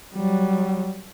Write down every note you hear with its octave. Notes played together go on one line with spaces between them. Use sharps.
F#3 G3